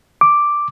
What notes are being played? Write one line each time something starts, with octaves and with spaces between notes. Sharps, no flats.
D6